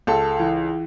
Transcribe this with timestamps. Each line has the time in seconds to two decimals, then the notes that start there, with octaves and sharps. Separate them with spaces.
0.07 C#2 A4
0.40 E3